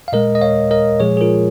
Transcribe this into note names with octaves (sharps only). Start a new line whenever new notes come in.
F5
A#2 G#3 A#4 D#5
D#5
C#5 F5
A#4 D#5
A#2 F3 G#3 G#4 C#5
G#4
F4 A#4